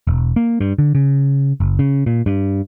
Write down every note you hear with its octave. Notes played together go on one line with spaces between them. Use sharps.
E1
A#3
G2
D3
C#3
F#1
C#3
A#2
G2